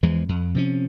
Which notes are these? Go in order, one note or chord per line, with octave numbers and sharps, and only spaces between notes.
E2 E3 F3 G#3
F2
C3 F3 C#4